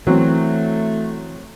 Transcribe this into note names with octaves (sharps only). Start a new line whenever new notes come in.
E3 F#3 A3 C4